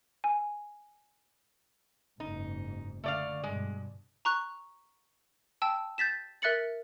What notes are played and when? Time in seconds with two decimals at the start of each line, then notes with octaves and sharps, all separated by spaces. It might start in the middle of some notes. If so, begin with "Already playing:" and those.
0.24 G#5
2.20 F#1 G#2 D#4
3.04 D3 A3 D5 F5
3.43 G2 B2 G#3
4.25 A#5 C#6 F#6
5.62 G5 A5 E6
5.98 G6 A6 B6 E7
6.42 A#4 E5 F#6 A6 C#7 F#7